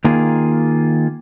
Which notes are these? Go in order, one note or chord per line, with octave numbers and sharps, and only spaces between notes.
D#3 A#3 F4 G#4